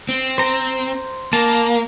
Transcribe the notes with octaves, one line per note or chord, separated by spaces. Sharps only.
C4
C5 A#5
A#3 A5